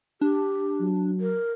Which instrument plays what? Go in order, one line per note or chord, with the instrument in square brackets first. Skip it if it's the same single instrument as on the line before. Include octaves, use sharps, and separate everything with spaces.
[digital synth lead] D4 [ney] G4
[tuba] F#3
[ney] A#4